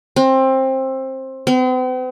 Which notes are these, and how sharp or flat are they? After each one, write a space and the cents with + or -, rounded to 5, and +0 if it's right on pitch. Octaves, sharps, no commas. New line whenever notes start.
C4 +20
C4 -45